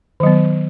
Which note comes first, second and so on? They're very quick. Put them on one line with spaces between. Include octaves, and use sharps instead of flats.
D#3 F#3 B3